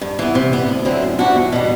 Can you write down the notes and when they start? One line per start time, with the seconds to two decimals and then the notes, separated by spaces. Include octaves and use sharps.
0.02 G2
0.19 E3 B3
0.35 C3
0.52 G3 B3
0.69 D2
0.85 D3 F#3 C4 E4
1.02 F#2
1.19 E3 G3 D4 F#4
1.36 E2
1.52 B2 G3